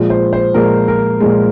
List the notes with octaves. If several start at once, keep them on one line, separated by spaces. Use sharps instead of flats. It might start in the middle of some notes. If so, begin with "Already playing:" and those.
Already playing: A#2 F3 G#3
C5
C5
A#2 F3 G#3 A#4
A#4
A#2 F3 G#3